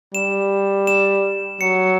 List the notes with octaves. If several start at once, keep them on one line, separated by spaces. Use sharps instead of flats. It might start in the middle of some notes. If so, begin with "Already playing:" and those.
G3 E7
E7
F#3 C#7